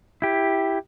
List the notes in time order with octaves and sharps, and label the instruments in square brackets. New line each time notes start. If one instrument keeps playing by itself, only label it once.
[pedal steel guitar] E4 G4